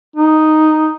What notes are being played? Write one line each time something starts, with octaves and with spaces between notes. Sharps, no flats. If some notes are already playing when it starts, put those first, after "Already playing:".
D#4